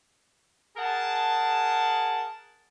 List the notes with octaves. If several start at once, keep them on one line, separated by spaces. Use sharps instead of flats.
G#4 A#4 F#5 A5